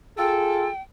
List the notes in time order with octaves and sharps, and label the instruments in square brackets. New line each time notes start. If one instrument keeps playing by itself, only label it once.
[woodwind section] F4 A4 [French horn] G#4 [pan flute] G5